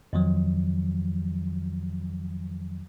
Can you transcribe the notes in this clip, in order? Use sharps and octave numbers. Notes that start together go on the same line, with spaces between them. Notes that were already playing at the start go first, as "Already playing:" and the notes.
F2 D#3 F3 F#3